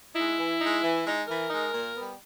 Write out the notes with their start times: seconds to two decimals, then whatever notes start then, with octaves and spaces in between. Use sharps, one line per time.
0.15 G#3 D#4 E4
0.38 E3
0.61 G#3 D#4
0.83 E3
1.05 G#3 D#4
1.28 E3 A#4
1.50 G#3 D#4
1.74 A#2
1.96 G3 B3